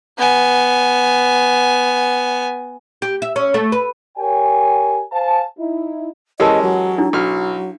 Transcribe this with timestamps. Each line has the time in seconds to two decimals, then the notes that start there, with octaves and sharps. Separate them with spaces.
0.19 B3 G#5
3.02 G4
3.22 E5
3.36 C#4
3.54 A3
3.72 B4
4.17 G4 A#4 C#5 G5 G#5
5.12 C5 F5 G#5 A5
5.58 D#4 E4
6.40 E3 G#3 C#4 G4 A#4 D#5 A5
6.62 F#3
6.98 D4 E4
7.13 B1 F#3 F6